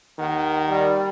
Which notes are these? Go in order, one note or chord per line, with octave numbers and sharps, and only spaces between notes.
D#2 D#3 A#4 F#5
G3